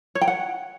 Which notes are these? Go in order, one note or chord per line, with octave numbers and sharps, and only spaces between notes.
C#5
G5
F#5